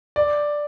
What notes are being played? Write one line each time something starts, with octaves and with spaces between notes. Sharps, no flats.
D5